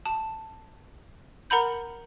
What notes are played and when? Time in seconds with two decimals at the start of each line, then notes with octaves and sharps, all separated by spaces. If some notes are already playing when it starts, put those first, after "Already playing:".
0.06 A5
1.50 A#4 F#5 A#5 B5 G6